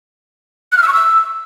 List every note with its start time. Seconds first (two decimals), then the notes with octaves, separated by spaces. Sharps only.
0.72 F#6
0.77 F6
0.83 E6
0.88 C#6
0.93 E6